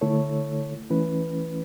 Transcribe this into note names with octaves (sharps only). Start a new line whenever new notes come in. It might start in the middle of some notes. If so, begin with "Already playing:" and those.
D3 A3 E4 A4 C#5
E3 A3 C#4 E4 B4